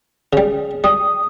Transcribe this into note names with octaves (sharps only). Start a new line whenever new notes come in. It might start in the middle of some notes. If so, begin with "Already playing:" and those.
C#3 G3 G#4
G3 D#6